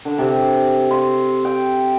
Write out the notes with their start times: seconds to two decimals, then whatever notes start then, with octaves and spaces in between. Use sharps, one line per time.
0.05 D3
0.18 C3
0.91 C6
1.45 G5